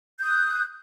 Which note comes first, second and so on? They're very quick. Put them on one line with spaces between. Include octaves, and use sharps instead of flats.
G6 D#6 F#6